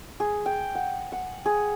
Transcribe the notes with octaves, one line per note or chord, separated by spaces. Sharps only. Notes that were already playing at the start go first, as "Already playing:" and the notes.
G#4
G5
F#5
F#5
G#4